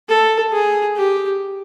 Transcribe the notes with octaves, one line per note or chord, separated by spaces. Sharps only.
A4
G#4
G4